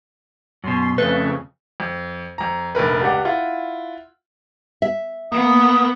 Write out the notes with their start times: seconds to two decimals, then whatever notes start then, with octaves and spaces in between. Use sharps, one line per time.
0.64 F#2 B2 C6
0.98 F2 C#3 A3 B4
1.80 F2
2.38 F2 A#5
2.75 F1 A#1 A#4 B4
3.02 C#2 G4 D5 F#5
3.25 E4 F4 F#5
4.82 E5
5.32 A#3 B3 D#6